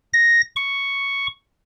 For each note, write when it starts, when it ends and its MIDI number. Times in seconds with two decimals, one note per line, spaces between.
0.13 0.41 94
0.56 1.27 85